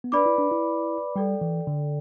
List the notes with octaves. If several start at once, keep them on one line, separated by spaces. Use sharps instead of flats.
B3
D4 B4 D5 B5 D6
E4
D4
E4
G3 A4 D5 G5
E3
D3